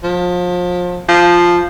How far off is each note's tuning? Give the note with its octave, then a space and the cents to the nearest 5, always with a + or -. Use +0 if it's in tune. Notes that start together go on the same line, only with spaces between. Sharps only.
F3 +30
F3 +0